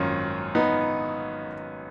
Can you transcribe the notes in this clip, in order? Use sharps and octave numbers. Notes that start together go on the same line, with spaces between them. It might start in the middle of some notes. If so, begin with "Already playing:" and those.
Already playing: G#1 F#2 D#3 A#3 C#4 F4
B3 D#4